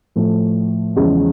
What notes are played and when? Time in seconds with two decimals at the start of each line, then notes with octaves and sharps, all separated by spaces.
0.16 A2 F3 A3
0.96 E2 C#3 F3 G#3